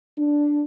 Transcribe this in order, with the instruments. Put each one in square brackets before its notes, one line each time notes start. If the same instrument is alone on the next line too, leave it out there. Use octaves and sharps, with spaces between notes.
[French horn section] D4